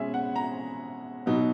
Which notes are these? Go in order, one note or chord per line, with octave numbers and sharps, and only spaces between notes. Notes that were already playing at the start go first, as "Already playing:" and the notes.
Already playing: B2 G#3 C#4 G#4 E5
F#5
A#5
B2 F#3 B3 D#4